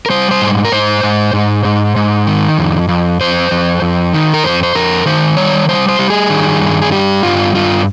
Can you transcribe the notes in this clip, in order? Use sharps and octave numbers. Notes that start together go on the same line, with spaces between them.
A#4
G3 C5
C5
G#2
A#4
G#2 C5
G#2
G#2
G#2
G#2
D#3
F2
F2
F2 C5
F2
F2
D#3
A#4
F2 C5
C5
F2 A#4
D#3 C5
G3 C#5
G3 C5
C5
G3
G#4
D#3
G2
G#4
G3 G4
G2 F4
G2 F4